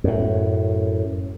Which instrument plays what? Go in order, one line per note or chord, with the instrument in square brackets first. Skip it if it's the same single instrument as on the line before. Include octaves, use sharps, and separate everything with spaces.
[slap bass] F#2 A2